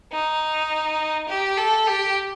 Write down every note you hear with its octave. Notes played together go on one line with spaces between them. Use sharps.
D#4
G4
A4
G4